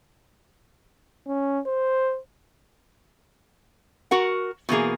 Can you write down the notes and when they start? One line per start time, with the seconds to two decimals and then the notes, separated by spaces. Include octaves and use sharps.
1.27 C#4
1.66 C5
4.11 F#4 A#4 F#5
4.69 B2 E3 A#3 G#4